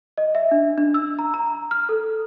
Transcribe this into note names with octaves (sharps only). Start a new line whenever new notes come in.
D#5
E5
D4
D4
E6
A#5
A#5
F6
A4